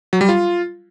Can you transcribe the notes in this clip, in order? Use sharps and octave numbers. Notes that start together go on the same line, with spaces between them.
F#3
G3
F4